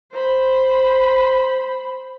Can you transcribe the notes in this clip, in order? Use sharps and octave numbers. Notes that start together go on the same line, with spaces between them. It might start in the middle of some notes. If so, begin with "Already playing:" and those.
C5 B5